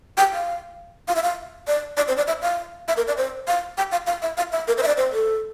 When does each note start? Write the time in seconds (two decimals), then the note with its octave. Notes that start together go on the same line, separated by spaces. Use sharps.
0.17 G5
0.33 F5
1.08 F5
1.16 E5
1.23 F5
1.67 D5
1.97 D5
2.08 C5
2.17 D5
2.28 E5
2.42 F5
2.88 E5
2.97 A#4
3.08 D5
3.17 C5
3.48 F5
3.78 G5
3.92 F5
4.07 F5
4.22 E5
4.37 F5
4.52 E5
4.68 A#4
4.78 C5
4.83 E5
4.87 D5
4.97 C5
5.13 A4